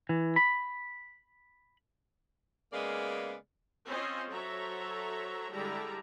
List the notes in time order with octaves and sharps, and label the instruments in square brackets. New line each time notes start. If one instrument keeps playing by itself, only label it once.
[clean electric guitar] E3
B5
[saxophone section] C#3 G#3 A#3 B3 D5 F5
[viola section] C4 C#4 F4 C5 D#5
F#3 A4 C5 C#5 E5 A#5
D3 G3 G#3 D4 E4 A#5